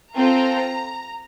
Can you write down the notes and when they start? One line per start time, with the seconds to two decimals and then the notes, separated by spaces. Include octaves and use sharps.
0.16 C4 F4 A4 A#5